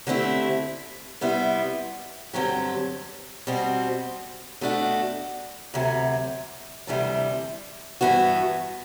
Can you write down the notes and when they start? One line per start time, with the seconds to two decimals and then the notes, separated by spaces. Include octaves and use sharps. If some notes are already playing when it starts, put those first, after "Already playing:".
0.07 D3 A3 C4 E4 G4
1.21 C3 G3 B3 E4
2.33 G2 D3 F#3 C4 G4
3.47 B2 G3 C4 F#4
4.61 B2 A3 D4 F#4
5.74 D2 C3 F#3
6.87 D2 C3 E3 G3 D4
8.01 G2 E3 B3 F#4